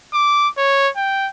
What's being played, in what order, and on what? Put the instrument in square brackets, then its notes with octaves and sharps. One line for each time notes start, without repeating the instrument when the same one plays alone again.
[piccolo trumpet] D6
C#5
G5